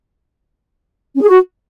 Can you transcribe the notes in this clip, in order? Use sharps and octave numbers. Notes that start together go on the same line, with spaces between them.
C#4
G#4
F#4